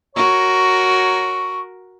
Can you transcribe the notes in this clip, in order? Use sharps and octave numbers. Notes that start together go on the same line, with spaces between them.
F#4 A#4 C#5 A#5 C#6